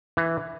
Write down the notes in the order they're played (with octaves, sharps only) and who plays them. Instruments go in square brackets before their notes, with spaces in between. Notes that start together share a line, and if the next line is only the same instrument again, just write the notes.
[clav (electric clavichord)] E3